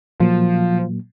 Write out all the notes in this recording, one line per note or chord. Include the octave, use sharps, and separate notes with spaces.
A#2 F3 F#3 A#3